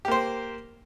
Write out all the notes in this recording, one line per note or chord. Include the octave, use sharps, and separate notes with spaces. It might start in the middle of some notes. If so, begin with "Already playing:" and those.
A#3 G4 C5